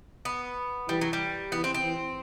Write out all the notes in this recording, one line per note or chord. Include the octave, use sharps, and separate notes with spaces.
B3
E3 G3
F#3
G3
E3 B3
C4
C4
E3